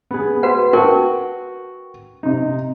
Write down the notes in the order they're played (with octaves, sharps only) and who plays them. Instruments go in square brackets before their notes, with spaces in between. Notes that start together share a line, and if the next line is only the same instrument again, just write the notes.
[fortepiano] B3 G#4
[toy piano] F#4 B4 F#5
[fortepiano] F#4 G5 A5 [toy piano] A#4
[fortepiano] C3 D#4